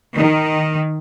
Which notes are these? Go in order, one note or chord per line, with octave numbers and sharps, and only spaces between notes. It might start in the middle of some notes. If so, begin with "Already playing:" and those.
D#3